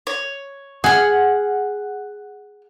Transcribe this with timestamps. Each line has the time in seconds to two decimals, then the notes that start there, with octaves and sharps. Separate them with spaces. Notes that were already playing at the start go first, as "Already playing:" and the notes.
0.07 C#5
0.84 G#4 F#5 F6